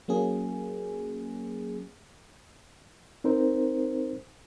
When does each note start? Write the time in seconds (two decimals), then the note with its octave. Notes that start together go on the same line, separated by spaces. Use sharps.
0.08 F#3 A#3 C#4 G#4
3.24 C4 D#4 A#4 C5